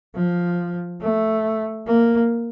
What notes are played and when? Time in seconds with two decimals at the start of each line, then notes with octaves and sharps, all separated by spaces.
0.15 F3
1.01 A3
1.87 A#3